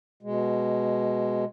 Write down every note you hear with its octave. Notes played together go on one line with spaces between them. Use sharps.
B2 G#3